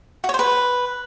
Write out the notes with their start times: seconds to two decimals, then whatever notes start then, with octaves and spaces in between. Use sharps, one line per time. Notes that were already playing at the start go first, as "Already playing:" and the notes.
0.24 F#4
0.29 C#5
0.34 C5
0.39 B4